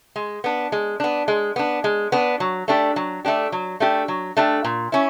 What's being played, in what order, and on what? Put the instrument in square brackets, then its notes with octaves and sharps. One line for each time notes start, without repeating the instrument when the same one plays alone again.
[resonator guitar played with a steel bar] G#3
B3 D4
G#3
B3 D4
G#3
B3 D4
G#3
B3 D4
F#3
A3 D4 G4
F#3
A3 D4 G4
F#3
A3 D4 G4
F#3
A3 D4 G4
A#2
C#4 E4